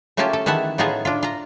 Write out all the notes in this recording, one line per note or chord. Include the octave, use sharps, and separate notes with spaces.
A3 A#3 C#4 F4 G4 A5
A4
D#3 E3 E5 F#5 A5
A2 B3 D#4 F4 G#4 A5
D4 F4
F4 A#5